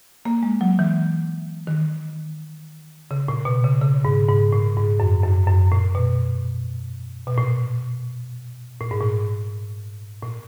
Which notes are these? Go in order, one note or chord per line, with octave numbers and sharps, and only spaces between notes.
A#3
G#3
F#3
E3
D#3
C#3
A#2
B2
C#3
C#3
G#2
G#2
A#2
G#2
F#2
F#2
F#2
A#2
B2
B2
A#2
A#2
G#2
A#2
A#2